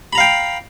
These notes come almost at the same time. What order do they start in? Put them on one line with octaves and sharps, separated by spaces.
B5 A#5 F5 G5